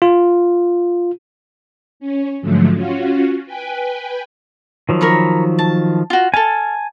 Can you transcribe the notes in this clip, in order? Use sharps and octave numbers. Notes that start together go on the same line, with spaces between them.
F4
C#4
G#2 D3 F3 F#3 A3
C#4 F4 F#4
B4 G5 G#5
D#3 F3 F#3
A#4 C#5 B5
A5
F4 F#4
A4 F5 G#5 A5